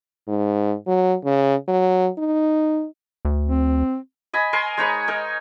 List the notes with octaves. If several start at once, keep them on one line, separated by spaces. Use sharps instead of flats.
G#2
F#3
C#3
F#3
D#4
D2
C4
D#5 G#5 B5
A#4 G#5 C6 C#6
G#3 D#4 C#5 B5
D#4 A#4